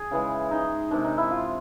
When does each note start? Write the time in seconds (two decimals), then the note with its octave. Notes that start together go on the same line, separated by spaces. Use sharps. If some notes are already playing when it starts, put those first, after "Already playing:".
Already playing: G#4
0.11 C#3 E3 G#3
0.51 D#4
0.91 C3 D#3 G#3 D4
1.05 D#4
1.18 E4
1.31 F4